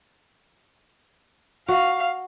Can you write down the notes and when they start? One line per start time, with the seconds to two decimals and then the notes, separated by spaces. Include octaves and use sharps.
1.68 F#4 F5